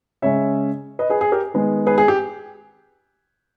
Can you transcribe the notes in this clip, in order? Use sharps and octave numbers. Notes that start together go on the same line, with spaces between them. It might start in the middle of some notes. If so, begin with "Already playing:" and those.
C#3 G#3 C#4 C#5 E5
B4 D#5
G#4 B4
G#4
G4 A#4
D#3 G#3 B3
G#4 B4
G#4
G4